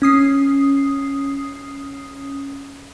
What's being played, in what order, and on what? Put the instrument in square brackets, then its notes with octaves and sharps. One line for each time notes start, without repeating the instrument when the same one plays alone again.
[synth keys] C#4 D#6 C7